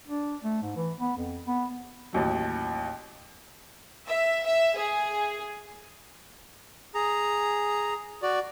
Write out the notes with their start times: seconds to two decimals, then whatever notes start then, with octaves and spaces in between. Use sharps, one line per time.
0.07 D4
0.43 A3
0.62 G#2
0.76 E3
0.98 B3
1.17 F2
1.47 B3
2.13 A1 D#2 F#3
4.07 E5
4.45 E5
4.77 G#4
6.95 G#4 A#5
8.23 F#4 D5